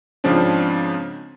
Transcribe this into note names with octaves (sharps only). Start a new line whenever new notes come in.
G#2 C#3 F3 C4 D4